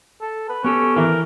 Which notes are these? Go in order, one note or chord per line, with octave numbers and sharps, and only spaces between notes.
A4
B4
B3 C#4 G4 A4
E3 A#4